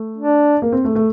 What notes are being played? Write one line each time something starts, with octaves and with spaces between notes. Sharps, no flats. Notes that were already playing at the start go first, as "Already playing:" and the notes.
Already playing: A3
D4
A#3
C4
A3
A3